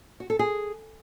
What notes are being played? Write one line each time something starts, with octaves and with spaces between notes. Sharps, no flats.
F#4
A4
G#4